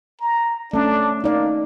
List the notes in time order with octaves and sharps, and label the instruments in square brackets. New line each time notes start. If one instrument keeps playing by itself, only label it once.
[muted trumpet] A#5
[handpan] A3 C#4 [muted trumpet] D4
[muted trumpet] A#3 [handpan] D#4 D5